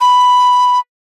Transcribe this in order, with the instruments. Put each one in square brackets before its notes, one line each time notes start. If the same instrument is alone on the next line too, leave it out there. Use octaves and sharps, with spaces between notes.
[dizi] B5